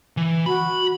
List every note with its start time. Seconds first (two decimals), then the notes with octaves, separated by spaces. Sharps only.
0.17 E3
0.46 F#4 B5